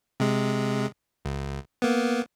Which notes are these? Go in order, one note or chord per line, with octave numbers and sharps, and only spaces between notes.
C3 G#3
C#2
A#3 B3